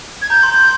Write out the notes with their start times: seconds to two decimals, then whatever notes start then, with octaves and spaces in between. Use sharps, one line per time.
0.22 G#6
0.30 A#5 G6
0.43 C6
0.49 G6
0.56 C6